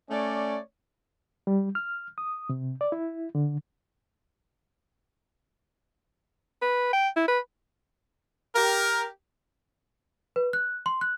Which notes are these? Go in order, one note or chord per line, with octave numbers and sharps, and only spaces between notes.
A3 C#4 C#5 D5
G3
F6
D#6
C3
D5
E4
D3
B4
G5
E4
B4
G4 A#4
B4
F#6
C6
F#6